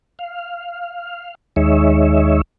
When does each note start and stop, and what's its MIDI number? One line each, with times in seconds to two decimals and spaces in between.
0.19 1.35 77
1.56 2.41 39
1.56 2.41 56
1.56 2.41 63
1.56 2.41 73
1.56 2.41 76